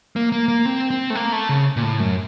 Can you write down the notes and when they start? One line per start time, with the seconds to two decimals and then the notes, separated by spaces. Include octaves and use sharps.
0.16 A#3
0.32 A#3
0.48 A#3
0.66 C4
0.90 C4
1.10 A3
1.15 A#3
1.32 A3
1.49 C#3
1.76 A#2
1.83 A2
2.00 F#2